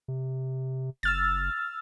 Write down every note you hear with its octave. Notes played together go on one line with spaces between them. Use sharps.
C3
F#1 E6 F6 A6